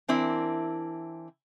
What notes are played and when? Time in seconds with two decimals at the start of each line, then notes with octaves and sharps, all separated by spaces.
0.08 E3 C4 D4 E4 A#4